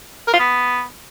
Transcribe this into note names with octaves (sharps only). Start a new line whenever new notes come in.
A#4
F4
B3